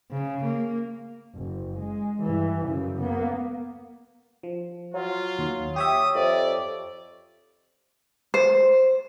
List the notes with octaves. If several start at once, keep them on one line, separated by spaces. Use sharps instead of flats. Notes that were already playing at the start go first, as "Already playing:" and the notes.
C#3
A#3
F#1
G#3
G2 E3
F#2 C#3
A#3 B3
F3
F#3 F4
D#2
G4 C#5 E5 D#6
F2 D5
C5